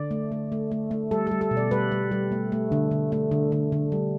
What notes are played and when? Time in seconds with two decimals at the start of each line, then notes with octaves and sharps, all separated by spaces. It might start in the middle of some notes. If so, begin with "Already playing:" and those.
Already playing: D3 D5
0.11 A3
0.32 A3
0.52 A3
0.72 A3
0.91 A3
1.11 G3 A4
1.27 G3 A4
1.41 A4
1.51 B2
1.57 D5
1.71 G3 B4
1.92 G3
2.11 G3
2.32 A3
2.52 A3
2.72 D3
2.91 D3
3.12 A3
3.31 D3
3.52 D3
3.72 D3
3.92 G3